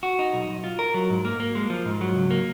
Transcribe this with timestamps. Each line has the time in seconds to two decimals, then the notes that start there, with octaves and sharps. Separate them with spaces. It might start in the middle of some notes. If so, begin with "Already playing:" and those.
0.03 F#4
0.19 D#4
0.33 B1
0.49 B1
0.64 F4
0.79 A#4
0.94 F#3
1.10 G#2
1.25 A#3
1.40 A#3
1.55 G#3
1.70 F3
1.85 G#2
2.01 F#3
2.16 C#2
2.30 A#3